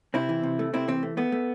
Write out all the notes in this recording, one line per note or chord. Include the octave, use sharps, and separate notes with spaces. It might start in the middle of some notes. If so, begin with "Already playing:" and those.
C3 C4 E4
E3
C3
A3
C3 C4 E4
E3 C4
A3
A3 B3
A3